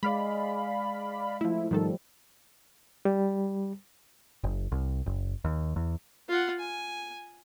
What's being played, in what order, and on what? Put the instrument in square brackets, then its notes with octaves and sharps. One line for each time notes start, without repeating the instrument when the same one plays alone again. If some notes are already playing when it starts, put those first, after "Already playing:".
[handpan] G#3 [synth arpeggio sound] D5 F5 B5
[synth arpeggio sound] F3 E4 [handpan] A3
[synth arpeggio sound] G#2 D#3 A4 [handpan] F3 G3
[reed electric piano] G3
[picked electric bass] F#1
C2
F#1
D#2
E2
[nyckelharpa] F4 F#5
G#5